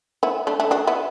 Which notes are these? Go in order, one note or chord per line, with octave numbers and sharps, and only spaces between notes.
B3 E4
A3 D4
A3 D4
D4 F#4
B3 E4